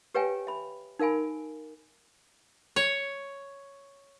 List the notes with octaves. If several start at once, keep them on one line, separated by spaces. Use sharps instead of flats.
G4 B4 C#5 F5 G5 G#5
E5 B5
D#4 A#4 F5 G#5 B5
C#5